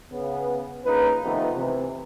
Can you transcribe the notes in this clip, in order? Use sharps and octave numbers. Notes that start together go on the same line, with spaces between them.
C#3 B3
A#1 C#3 A#3 D#4 B4
C3 D#3 F3 A3 B3 D#4
C3 E3